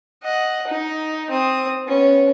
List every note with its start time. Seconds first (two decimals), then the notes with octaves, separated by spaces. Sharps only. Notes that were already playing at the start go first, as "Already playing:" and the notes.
0.24 D#5 F#5
0.67 D#4
1.30 C4 D#6
1.86 B3 C#4